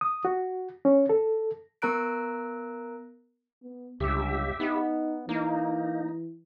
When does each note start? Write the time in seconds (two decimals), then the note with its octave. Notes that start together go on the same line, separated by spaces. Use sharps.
0.01 D#6
0.25 F#4
0.85 C#4
1.09 A4
1.82 B3 A#4 A#5 F#6 D7
3.63 B3
4.00 G1 C#2 G4 E5
4.60 B3 D#4
5.29 E3 A#3 D#4